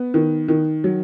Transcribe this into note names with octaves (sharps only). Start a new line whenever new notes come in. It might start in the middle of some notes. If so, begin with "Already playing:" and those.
Already playing: B3
D#3
D#3
F#3